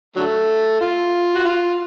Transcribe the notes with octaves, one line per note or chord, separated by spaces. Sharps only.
D3 F#3 A3
F4
F#4
F4